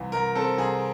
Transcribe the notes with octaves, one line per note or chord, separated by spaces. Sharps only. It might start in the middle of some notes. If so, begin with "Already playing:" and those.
Already playing: C2 E3
C2 A#4
C4 A4
C2 G#4